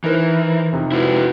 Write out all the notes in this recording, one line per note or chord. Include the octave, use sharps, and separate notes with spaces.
E3 D#4 A#4 C5
F2 C3 D#4
E4 F#4 B4